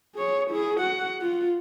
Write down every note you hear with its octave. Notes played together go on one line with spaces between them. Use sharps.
G#4 C#5
E4 G#4
F#4 F#5
F4